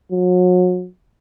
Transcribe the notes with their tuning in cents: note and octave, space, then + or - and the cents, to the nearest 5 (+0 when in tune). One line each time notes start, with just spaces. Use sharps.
F#3 -35